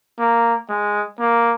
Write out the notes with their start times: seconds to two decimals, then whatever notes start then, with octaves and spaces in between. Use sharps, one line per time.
0.19 A#3
0.69 G#3
1.20 A#3